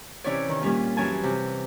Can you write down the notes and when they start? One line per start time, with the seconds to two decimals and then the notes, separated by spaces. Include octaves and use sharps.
0.24 C3 E3 C#4 E4 C#5 D5
0.48 D#3
0.61 A#2 G3 C#4 F4
0.97 F#2 E3 C#4 G#5 A5
1.23 C3